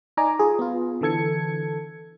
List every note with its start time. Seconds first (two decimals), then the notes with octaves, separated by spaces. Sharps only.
0.17 D#4 D5 G#5 A#5 D6
0.39 F4 G#4
0.59 B3 F4
1.01 D3 E3 A4 G#6 C#7